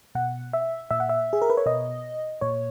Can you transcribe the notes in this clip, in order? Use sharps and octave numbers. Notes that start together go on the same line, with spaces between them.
B2 F#5
E5
A#2 E5
F#5
E5
G#4
A#4
B4
C#5
B2 D#5
A#2 C#5